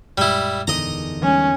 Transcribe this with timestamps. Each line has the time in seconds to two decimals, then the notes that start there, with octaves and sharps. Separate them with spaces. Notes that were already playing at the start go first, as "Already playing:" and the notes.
0.18 F#2 A#2 G3 G#3 E4
0.67 E2 D3 D#3 D#5 A#5
1.23 E3 G3 G#3 C#4